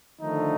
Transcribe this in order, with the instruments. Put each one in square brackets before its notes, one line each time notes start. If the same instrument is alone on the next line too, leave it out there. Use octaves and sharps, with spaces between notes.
[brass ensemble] D3 D#3 F3 A3 D#4